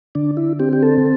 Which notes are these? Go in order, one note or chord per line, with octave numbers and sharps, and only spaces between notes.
D3 D4
E4
C4 G4
G4
A4